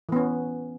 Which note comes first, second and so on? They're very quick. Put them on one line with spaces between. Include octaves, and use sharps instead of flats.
E3 B3 C#4